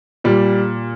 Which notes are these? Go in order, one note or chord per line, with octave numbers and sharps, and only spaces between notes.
A#2 G3